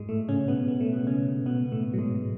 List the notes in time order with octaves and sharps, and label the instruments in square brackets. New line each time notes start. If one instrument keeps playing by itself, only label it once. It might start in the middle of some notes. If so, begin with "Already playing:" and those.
Already playing: [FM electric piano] G#2 G#3
A2 A3
C#3 C#4
B2 B3
B3
A3
B2 B3
C#3 C#4
B2 B3
B3
A2 A3
F#3
G#2 G#3